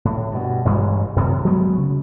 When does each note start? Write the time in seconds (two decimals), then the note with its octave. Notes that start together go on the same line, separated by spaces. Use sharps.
0.05 A2
0.31 G2 B2
0.65 A1 G2 G#3
1.16 F#2 A2 C3 D#3
1.45 F#3 G#3 A3 B3
1.77 C#3